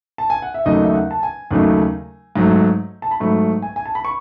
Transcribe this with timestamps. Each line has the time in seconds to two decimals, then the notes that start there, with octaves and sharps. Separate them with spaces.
0.18 A5
0.30 G#5
0.42 F#5
0.54 E5
0.66 D#2 C#3 F#3 A3 D#4 D#5
0.84 E5
0.94 F#5
1.11 A5
1.23 G#5
1.51 D#2 C#3 F#3 A3 D#4
2.36 G#2 F#3 A3
3.02 A5
3.11 B5
3.20 G#2 F#3 A3 C#6
3.62 G#5
3.76 G#5
3.86 A5
3.95 B5
4.05 C#6